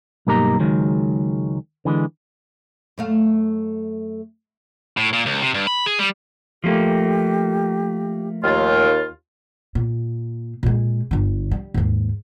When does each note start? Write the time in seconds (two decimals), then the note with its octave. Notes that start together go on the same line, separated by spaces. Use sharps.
0.27 B1 G2 A#3 D#4 G4 A#5
0.60 C#2 D#3 F#3 G#3
1.85 D3 E3 G#3
2.98 F#2 A3 F5
4.97 A2
5.13 A#2
5.26 C#2
5.42 C3
5.54 G2
5.67 B5
5.86 G#4
5.99 G3
6.64 F3 A3 A#3 G4
8.43 D#2 F4 C#5
9.75 A#2
10.63 A#2 G#3
11.11 G1 D3
11.51 G3
11.74 D#2 G#2